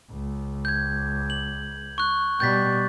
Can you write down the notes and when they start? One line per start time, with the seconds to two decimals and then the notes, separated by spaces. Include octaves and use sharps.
0.11 C#2
0.65 G6 G#6
1.30 F#7
1.98 C#6 F#6
2.40 B2 G3 G6 A6 B6